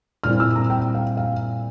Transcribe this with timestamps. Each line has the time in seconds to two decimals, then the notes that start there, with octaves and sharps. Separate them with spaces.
0.24 A#2 G3 C4 E4 F6
0.40 E6
0.56 A#5
0.70 G5
0.95 F5
1.17 F5